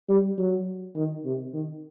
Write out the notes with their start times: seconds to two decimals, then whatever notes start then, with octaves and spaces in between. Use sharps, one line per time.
0.09 G3
0.38 F#3
0.96 D#3
1.25 C3
1.54 D#3